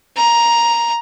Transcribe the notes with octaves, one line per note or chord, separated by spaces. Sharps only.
A#5